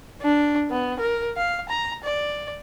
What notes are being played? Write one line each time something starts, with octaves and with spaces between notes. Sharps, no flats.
D4
B3
A#4
F5
A#5
D5